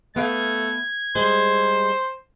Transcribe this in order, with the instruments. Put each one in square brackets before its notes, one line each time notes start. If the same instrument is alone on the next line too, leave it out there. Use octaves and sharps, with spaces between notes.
[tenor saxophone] A3 [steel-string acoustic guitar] B3 F5 [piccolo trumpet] G#6
[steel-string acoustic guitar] G3 G#3 G#4 [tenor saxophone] C5